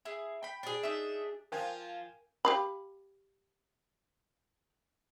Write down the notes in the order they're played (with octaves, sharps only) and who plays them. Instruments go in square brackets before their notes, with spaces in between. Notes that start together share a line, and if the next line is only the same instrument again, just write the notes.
[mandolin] E4 G#4
G5 B5
[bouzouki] D4 G#4
[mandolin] D#4 E5
[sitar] F3 F4 [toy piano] A#4 [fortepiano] G5 G#5
[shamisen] G4 F5 B5